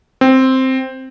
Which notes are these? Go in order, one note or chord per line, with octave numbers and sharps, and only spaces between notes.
C4